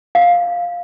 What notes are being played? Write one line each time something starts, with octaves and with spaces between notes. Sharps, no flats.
F5